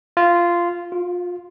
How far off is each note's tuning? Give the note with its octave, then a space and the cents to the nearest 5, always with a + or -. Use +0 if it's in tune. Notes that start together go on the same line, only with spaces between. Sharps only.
F4 -10
F4 +30